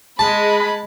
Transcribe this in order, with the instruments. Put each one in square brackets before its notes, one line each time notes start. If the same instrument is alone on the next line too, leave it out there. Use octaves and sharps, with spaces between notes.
[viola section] G#3 [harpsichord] A5 [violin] B5